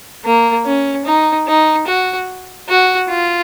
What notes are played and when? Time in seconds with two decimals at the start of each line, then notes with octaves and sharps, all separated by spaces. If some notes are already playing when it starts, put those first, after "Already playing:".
0.25 A#3
0.66 C#4
1.05 D#4
1.47 D#4
1.87 F#4
2.68 F#4
3.10 F4